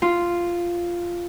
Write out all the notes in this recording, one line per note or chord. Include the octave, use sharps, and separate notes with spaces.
F4